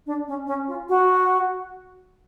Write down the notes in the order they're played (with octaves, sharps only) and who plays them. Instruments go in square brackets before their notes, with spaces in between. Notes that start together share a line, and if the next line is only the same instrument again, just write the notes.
[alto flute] D4
C#4
C#4
F4
F#4